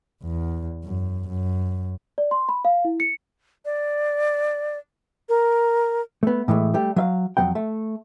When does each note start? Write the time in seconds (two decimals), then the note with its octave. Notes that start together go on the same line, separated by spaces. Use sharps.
0.23 E2
0.84 F#2
1.28 F#2
2.18 D5
2.31 C6
2.49 B5
2.65 F5
2.85 E4
3.00 C#7
3.65 D5
5.29 A#4
6.23 A3 B3
6.48 A2 E3 G#3 A3
6.74 G3 A3 G4
6.96 F#3 E5 F5
7.37 F2 F#3 F#5 G5
7.55 A3